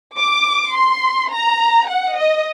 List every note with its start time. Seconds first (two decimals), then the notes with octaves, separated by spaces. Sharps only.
0.18 D6
0.74 C6
1.32 A#5
1.89 F#5
2.17 D#5